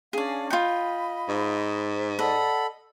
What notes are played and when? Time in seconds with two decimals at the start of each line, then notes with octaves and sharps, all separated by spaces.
0.13 C#4 D4 G#4 D5 F5
0.50 F4 D#5 G5 B5
1.29 G#2
2.19 A4 D5 D#5 F#5 B5